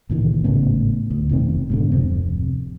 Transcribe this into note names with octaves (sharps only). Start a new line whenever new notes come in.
C#2 A#2 D#3 E3
G#1 A2 C#3 B3
D2
F1 B2 D#3 C4
G#2 B2 D3
D1 F2 C3